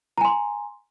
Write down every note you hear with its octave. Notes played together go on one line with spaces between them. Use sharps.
G#5 A#5 C6